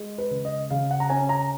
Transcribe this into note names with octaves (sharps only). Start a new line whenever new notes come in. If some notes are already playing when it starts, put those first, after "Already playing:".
Already playing: G#3
B4
C#3
D#5
C#3 F5
F#5
A#5
C#4 G#5
A#5